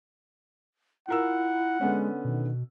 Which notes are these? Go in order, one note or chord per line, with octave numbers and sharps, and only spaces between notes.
E4 F4 A#4 F#5 E6
D3 G#3 B3 C#4
B2 D#3